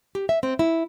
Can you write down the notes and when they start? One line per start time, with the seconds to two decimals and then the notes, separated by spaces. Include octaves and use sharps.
0.15 G4
0.29 E5
0.43 C4
0.59 E4